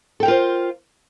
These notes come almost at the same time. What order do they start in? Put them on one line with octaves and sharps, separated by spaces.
A4 G5 A#4 F4 C5